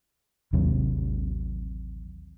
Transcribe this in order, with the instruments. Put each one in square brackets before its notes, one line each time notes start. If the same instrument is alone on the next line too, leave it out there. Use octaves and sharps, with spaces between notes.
[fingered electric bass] A1 D#2 C3 F#3